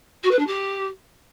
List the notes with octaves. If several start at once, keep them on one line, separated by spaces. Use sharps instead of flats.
F#4
B4
D4
G4